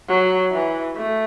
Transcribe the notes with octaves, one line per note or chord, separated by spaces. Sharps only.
F#3
E3
A3